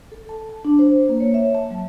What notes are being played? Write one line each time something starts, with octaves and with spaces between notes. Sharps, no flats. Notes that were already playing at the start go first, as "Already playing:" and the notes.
A4
A5
A5
D4
C5
A#3
C#5
E5
A5
F#3